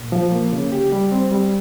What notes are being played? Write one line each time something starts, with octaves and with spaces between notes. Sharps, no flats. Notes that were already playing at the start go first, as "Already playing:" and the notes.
Already playing: A#2
F3
A#3
C#3
G4
G3
C4
G3